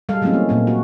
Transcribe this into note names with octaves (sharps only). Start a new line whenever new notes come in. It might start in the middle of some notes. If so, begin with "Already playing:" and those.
G3 G#3 A4 F5
E3 F#3 G#3 A3 C4 C#4
A#3
A#2 A#3 C4
F#4